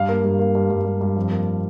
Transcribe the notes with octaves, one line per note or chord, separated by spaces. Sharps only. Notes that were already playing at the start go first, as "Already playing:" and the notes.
Already playing: G2 F5
A#3
G2
A#3
G2
G2
G2
G2
F2
A#3